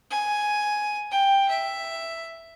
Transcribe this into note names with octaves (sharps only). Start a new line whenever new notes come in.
G#5
G5
E5